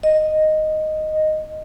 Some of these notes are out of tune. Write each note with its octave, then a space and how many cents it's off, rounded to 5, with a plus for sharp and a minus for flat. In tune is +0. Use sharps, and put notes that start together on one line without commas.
D#5 -5